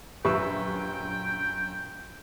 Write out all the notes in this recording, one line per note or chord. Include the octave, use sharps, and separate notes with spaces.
A#1 F#2 G4 B4 E5 G5 C#6 E6